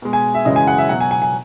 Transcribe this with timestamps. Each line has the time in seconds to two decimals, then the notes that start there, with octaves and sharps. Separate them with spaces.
0.02 B2 G#3
0.13 G#5
0.35 E5
0.45 F#2 C#3 E3 G#3 D#5
0.56 G#5
0.67 F#5
0.78 E5
0.89 B2 F#3 F#5
1.00 G#5
1.11 G#5
1.22 G#5